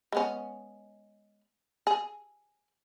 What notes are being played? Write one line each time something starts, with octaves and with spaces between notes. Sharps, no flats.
G#3 B3 C#4
G#4